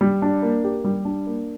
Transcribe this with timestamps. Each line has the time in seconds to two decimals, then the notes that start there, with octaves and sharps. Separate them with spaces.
0.01 G3
0.22 D4
0.43 A#3
0.64 G4
0.84 G3
1.05 D4
1.27 A#3